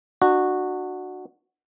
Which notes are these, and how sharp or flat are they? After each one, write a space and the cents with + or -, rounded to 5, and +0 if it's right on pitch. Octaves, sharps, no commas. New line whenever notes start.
D4 +35 F#4 -5